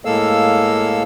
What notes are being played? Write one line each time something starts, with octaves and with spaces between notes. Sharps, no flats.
A2 G#3 A#3 A4 F5 E6